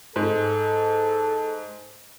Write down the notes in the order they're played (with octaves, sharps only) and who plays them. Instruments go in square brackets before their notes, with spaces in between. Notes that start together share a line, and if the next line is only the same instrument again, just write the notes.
[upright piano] G#2 [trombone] A4